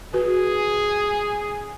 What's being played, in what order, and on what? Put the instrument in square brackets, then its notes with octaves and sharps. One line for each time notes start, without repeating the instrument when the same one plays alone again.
[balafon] F#4 B4 [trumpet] G#4